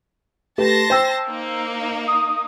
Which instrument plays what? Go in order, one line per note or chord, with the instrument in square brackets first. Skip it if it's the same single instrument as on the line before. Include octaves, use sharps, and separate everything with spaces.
[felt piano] A3 G4 B4 [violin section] A5 C6 A#6
[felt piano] C5 G5 E6
[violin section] A#3 D#4
[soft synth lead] D#6